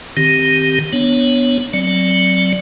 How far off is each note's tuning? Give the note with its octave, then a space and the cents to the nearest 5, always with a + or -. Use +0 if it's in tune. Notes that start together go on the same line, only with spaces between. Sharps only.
D#3 +0 C4 +0 G4 +0
B3 +0 D4 +0 C#5 +0
F#3 +0 C4 +0 D5 +0